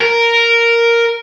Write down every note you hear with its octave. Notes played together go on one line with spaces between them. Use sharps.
A#4